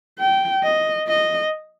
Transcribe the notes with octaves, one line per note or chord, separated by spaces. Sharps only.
G5
D#5
D#5